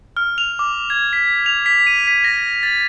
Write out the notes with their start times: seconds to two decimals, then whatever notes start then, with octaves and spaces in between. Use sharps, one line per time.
0.17 F6
0.38 F7
0.59 D6
0.90 G#6
1.13 B6
1.46 F7
1.66 B6
1.87 D#7
2.08 B6
2.24 A#6
2.63 A6